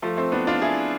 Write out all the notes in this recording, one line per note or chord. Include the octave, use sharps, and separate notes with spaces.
F3 A3
A3 C4
B3 D4
D4 F4
E4 G#4